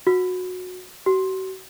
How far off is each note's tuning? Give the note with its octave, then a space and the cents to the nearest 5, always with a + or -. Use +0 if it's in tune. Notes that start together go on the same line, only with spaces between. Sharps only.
F#4 -20
F#4 +40